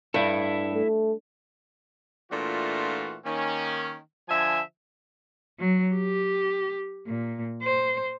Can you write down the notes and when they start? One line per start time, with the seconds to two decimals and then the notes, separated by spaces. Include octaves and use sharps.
0.14 G2 E4 A4
0.73 A3
2.31 A#2 E3 A3 D4 F4 F#4
3.24 D#3 A#3 C#4
4.28 D3 F3 E5 G#5
5.60 F#3
5.95 G4
7.07 A#2
7.62 C5